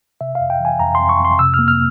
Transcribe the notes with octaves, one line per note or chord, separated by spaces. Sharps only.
C3 E5
F2 F5
G5
E3 G#5
F2 A#5
F2 C6
C#6
F2
C6
C3 E6
A#3 F6
F6